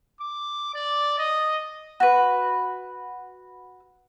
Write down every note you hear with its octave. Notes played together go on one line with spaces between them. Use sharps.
D6
D5
D#5
F#4 B4